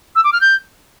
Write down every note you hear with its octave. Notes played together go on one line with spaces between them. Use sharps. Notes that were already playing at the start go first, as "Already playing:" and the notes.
E6
D6
F6
G6